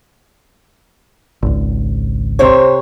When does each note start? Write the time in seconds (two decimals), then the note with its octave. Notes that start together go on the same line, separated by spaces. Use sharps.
1.42 G#1 C#2
2.39 C3 C5 C#5